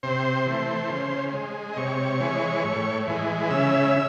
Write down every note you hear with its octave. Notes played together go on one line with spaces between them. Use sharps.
C3 C5
E3 A3
C#3
G#3
D#5
C3 C#5
E3 G#3
A2
E3 G#3
C#3 E5